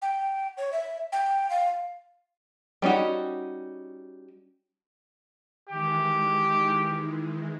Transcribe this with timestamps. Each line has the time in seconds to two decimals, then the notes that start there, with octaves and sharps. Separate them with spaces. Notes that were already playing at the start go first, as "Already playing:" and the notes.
0.02 G5
0.57 C#5
0.72 E5
1.12 G5
1.50 F5
2.82 G3 C#4 D#4 F#4
5.69 D#3 E3 G#3 G4